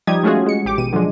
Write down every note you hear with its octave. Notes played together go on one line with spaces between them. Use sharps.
F3 G3 D#4 G4 D#6 G#6
G#3 A3 C#4 F4 F#4 G#4
G#3 C#7
A1 G4 D6
B2 D#7
D3 F3 F#3 G#3